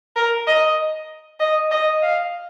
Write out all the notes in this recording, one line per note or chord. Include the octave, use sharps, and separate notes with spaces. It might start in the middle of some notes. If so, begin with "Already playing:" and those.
A#4
D#5
D#5
D#5
F5